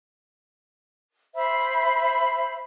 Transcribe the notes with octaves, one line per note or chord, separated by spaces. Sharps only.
C5 E5 B5